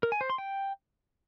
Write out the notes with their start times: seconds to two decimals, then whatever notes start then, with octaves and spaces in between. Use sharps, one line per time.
0.03 A#4
0.12 G#5
0.21 C5
0.30 C6
0.38 G5